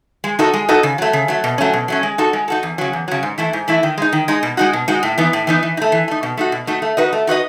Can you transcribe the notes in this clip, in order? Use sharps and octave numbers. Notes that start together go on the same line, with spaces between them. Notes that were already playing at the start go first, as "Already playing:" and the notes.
G#3
D#4 F#4 A4 D#5
G#3
D#4 F#4 A4 D#5
C#3
F#3 A3
C#3
F#3 A3
B2
F#3 A3 C#4
B2
F#3 A3 C#4
G#3
D#4 F#4 A4
G#3
D#4 F#4 A4
E2
C#3 F#3
E2
C#3 F#3
G#2
E3 A3 E4
G#2
E3 A3 E4
D#3
G#3 D#4
D#3
G#3 D#4
B2
G#3 D#4 F#4
B2
G#3 D#4 F#4
A2
E3 B3 D#4
A2
E3 B3 D#4
E3
D#4
A3
E3
A3 D#4
B2
A3 D#4 F#4
B2
A3 D#4 F#4
A3
D#4 F#4 B4 D#5
A3
D#4 F#4 B4 D#5